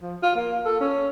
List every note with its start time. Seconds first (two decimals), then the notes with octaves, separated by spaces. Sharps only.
0.02 F3
0.23 F4
0.36 A#3
0.66 A4
0.80 C#4